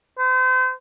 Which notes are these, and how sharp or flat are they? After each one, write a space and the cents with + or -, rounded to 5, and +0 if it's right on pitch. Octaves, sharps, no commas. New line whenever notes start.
C5 -35